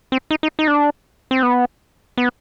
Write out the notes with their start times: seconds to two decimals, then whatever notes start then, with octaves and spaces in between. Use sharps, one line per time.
0.12 C4
0.31 D#4
0.43 D#4
0.59 D#4
0.68 D4
1.31 C4
1.43 B3
2.18 B3